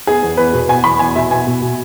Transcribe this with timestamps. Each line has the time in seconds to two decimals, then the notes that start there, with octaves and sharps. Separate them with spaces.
0.07 B3 G#4
0.23 E2
0.37 E2 B4
0.53 B2
0.68 B3 G#5
0.84 E2 B5
0.99 E2 G#5
1.16 B2 E5
1.31 B3 G#5
1.47 B2
1.62 B2